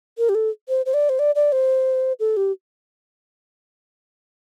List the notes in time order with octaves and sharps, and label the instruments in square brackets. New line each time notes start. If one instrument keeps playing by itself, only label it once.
[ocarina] A#4
G4
A4
C5
C5
D5
C5
D5
D5
C5
A4
G4